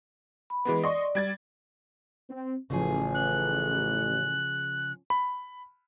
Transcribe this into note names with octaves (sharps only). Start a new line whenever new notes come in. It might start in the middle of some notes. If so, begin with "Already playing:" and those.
B5
E3 G#3 B3
D5 D#5 C6 C#6
G3 G#6 A6
C4
A1 C#3 F3 G#4
F#6
B5